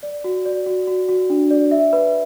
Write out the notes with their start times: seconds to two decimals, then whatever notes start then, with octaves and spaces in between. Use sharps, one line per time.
0.03 D5
0.24 F#4
0.46 D5
0.66 F#4
0.87 F#4
1.08 F#4
1.30 D4
1.50 D5
1.71 E5
1.93 B4